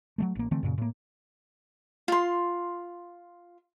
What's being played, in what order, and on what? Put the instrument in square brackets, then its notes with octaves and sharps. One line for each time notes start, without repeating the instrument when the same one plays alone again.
[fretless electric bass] F#3 G#3 A3
A1 A#3
D3 E3 A3 C4
F#2 A#2 C#3
A2 A#3
[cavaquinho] F4 C6